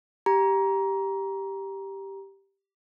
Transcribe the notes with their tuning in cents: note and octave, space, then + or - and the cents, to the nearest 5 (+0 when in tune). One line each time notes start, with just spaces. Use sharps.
G4 +0 A#5 +20